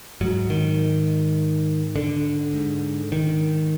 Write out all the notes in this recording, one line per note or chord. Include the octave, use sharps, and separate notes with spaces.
G#2 F#3
D#3
D3
G#2
D#3